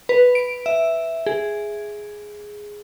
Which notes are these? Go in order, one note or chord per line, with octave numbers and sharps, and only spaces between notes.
B4
D7
E5
G#4